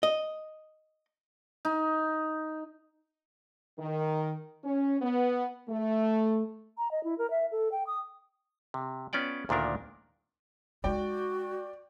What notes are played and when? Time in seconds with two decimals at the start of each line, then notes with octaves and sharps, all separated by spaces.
0.03 D#5
1.65 D#4
3.78 D#3
4.63 C#4
5.01 B3
5.69 A3
6.78 A#5
6.91 D#5
7.04 E4
7.18 A#4
7.31 E5
7.52 A4
7.72 G5
7.87 D#6
8.74 C3
9.13 B3 C#4 F4 D5 G5
9.49 D2 A#2 D#3 D4 A#4
10.84 G#3 D#4 F#4 D5 G5